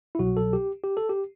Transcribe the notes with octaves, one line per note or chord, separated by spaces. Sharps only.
E4
C2 B2 F#3 F#4
A4
G4
G4
A4
G4